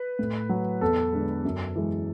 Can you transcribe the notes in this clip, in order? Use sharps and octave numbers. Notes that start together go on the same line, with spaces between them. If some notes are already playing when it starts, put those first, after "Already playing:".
Already playing: B4
A2
F#3
E2 A4
D3 G#3
F#2
E3 G#3